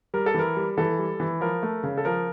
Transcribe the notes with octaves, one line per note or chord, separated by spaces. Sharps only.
G3 A#4
A4
E3 A#4
G3
E3 A4
G3
E3
F3 A#4
A3
C#3
A4
F3 A#4